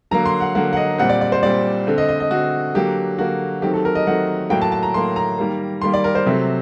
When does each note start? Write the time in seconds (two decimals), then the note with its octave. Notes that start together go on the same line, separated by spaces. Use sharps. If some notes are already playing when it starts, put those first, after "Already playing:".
0.11 D3 F#3 A#3 A#5
0.26 C6
0.40 F#5
0.55 D3 F#3 A#3 F#5
0.73 F#5
0.77 D#5
0.98 A#2 G3 C4 F#5
1.09 D5
1.21 D5
1.32 C5
1.43 A#2 G3 C4 D5
1.87 D3 A3 C4
1.98 D#5
2.09 D#5
2.20 D#5
2.31 D3 A3 C4 F#4
2.75 D3 F#3 A#3 G4
3.18 D3 F#3 A#3 F#4
3.62 D#3 F#3 A3 C4 G4
3.74 A4
3.85 A#4
3.95 D#5
4.07 D#3 F#3 A3 C4 F#5
4.50 A2 F#3 A#3 G5
4.62 A5
4.72 A5
4.83 A#5
4.94 A2 F#3 A#3 C6
5.16 A#5
5.39 D#3 G3 A#3
5.82 D#3 G3 A#3 C6
5.94 D5
6.04 A#4
6.15 C5
6.26 C3 F#3 A3 C4